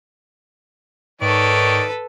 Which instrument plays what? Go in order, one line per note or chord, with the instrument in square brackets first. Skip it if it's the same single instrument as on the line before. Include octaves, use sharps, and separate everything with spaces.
[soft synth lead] G#2 [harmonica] D#3 C#5 D5 [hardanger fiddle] A4 B4